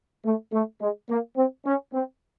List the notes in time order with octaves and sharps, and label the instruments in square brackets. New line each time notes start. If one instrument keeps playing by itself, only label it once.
[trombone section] A3
A3
G#3
A#3
C4
C#4
C4